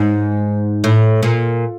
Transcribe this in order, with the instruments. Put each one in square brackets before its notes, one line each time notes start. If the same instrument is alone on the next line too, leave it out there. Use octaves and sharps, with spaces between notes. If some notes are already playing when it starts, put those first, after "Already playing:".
Already playing: [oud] G#2
A2
A#2